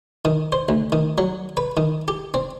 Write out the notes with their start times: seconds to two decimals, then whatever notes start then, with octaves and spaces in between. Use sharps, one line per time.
0.25 D#3
0.52 C5
0.69 D2
0.92 D#3
1.18 F#3
1.57 B4
1.77 D#3
2.08 G4
2.34 C4